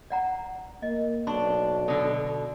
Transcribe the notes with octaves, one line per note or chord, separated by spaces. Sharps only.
D5 F#5 A#5
A#3 D#5
B1 D4 C6 C#6
B2 D3 A4